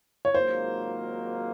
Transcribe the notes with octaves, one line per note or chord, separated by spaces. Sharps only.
C#5
G#1 G#2 F#3 A#3 F4 C5